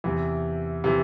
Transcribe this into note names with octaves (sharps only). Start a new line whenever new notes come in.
E2 C3 E3
C3 E3